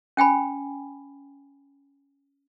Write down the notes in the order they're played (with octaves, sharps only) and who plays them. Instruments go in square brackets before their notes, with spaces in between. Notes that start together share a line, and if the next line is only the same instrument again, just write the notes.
[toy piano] C#4 G5 G#5 B5